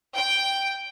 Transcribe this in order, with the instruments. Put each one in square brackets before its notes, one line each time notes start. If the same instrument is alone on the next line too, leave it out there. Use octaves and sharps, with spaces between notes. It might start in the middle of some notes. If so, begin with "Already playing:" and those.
[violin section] G5